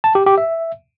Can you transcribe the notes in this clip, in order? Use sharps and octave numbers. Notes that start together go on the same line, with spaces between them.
A5
G4
G4
E5